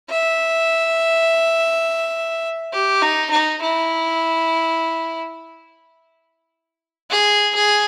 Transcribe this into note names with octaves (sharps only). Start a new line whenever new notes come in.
E5
G4
D#4
D#4
E4
G#4
G#4